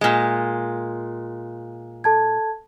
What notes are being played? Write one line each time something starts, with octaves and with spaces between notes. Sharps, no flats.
A#2 G#3
A4 A5 G#6